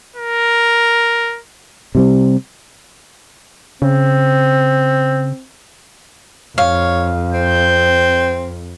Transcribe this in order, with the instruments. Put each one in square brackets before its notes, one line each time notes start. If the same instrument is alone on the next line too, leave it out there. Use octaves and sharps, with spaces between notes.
[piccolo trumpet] A#4
[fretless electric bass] C3 G3 C4
[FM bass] C#3 [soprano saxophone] C4
[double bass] F2 [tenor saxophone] C#5 [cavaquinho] F5
[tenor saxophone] C4 [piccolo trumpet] G6